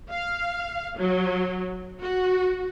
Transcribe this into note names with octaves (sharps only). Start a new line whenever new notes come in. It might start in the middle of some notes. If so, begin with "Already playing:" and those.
F5
F#3
F#4